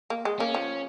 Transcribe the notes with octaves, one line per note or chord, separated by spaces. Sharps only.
A#3
G#3
A#3 C#4
F3